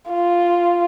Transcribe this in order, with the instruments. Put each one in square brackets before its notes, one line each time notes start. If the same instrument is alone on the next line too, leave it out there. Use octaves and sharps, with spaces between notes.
[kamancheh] F4